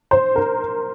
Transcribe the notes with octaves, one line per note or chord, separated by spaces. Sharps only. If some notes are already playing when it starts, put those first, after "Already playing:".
C5
A#4